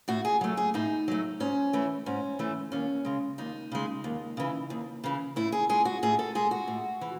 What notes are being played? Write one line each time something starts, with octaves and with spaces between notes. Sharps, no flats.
A2 F#4
G#4
F#3 A3
G#4
A2 D#4
F#3 A3
G#2 C#4
E3 A3
G#2 C#4
E3 A3
D#2 C#4
C#3 G#3
D#2 D#4
C#3 G#3
D#2
C#3 E3
D#2
C#3 E3
A2 E4
G#4
G#3 G#4
F#4
A2 G#4
A4
G#3 G#4
F#4
A2
E3